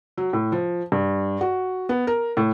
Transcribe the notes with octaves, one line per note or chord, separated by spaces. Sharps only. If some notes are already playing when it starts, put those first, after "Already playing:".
F#3
A2
F3
G2
F#4
B3
A#4
A2